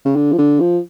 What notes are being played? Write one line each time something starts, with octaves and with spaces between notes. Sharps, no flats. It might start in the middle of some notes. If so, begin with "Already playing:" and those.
C#3
D3
F3
D3
F3